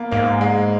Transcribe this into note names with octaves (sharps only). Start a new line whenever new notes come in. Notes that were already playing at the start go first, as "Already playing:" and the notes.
Already playing: A#3 B3
G#2 A#3
G#3